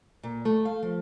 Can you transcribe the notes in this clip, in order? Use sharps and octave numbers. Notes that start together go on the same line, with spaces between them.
A#2
A3
F5
F3